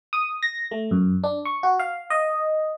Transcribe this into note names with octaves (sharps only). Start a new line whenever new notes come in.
D#6
A#6
A3
F#2
D4
C#6
F#4
F5
D#5